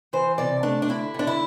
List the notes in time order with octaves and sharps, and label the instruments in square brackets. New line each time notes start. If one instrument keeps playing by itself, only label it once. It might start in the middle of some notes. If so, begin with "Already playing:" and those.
[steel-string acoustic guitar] E3 C5
C3 D5
A3 D4
D4
D3 E4
D3 D4
E4